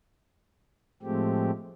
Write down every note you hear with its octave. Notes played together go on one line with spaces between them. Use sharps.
A2 F3 G#3 A3 C4 G4